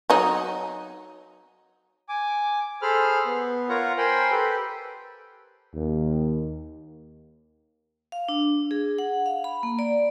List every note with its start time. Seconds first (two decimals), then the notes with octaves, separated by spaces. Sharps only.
0.10 F#3 D#4
2.09 G#5 D6
2.82 G#4 A4 C5 B5 F6
3.26 B3
3.69 F4 A#4 C#5 F#5 A#5
3.98 A#4 C5 G5 G#5 B5 C6
4.31 G4 A4 B4
5.74 D#2
8.12 F5
8.28 D4
8.71 G#4
8.98 F#5
9.26 F5
9.44 B5
9.63 A#3
9.79 D5